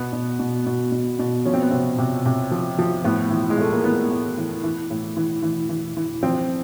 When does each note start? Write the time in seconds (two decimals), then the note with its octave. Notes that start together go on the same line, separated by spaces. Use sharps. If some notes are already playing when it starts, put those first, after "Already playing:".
Already playing: B2 B3
0.13 B2
0.39 B2
0.66 B2
0.92 B2
1.19 B2
1.45 F3 C#4
1.54 C4
1.62 B3
1.71 C3 C4
1.98 C3
2.26 C3
2.51 F3
2.79 F3
3.04 A2 B3
3.30 E3
3.50 G#3
3.57 A2 A3
3.72 A#3
3.84 E3 B3
4.11 A2
4.38 E3
4.63 E3
4.91 A2
5.17 E3
5.43 E3
5.69 E3
5.97 E3
6.23 F3 C4